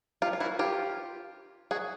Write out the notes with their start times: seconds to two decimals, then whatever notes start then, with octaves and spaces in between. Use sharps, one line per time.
0.22 F4 G4
0.33 F4
0.40 E4 F#4
0.59 F4 G4
1.71 F#4 G#4